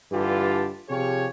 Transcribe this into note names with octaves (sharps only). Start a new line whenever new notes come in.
G2 D3 E3 F4 G4 A5
C3 F3 G4 G#4 C#5